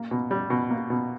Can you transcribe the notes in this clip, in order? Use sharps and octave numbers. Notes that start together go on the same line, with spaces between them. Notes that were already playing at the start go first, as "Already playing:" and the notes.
Already playing: A#3
B2
G3
B2
A#3
B2